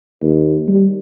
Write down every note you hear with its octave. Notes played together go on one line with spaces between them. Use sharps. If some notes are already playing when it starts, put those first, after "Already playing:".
D#2
G3